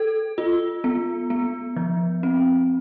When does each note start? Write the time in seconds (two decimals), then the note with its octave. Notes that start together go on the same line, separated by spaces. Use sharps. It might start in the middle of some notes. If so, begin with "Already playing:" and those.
Already playing: A4
0.38 F4
0.84 B3
1.30 B3
1.76 F3
2.23 C4